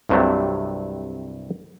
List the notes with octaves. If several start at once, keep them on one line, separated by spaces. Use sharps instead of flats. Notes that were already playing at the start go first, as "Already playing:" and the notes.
C2 G2 C3 F#3 A3